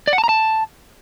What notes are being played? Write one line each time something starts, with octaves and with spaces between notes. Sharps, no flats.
D5
F#5
A5
A#5
A5